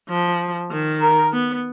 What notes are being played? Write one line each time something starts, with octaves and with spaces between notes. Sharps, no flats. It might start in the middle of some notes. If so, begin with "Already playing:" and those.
F3
D#3
A#4
B3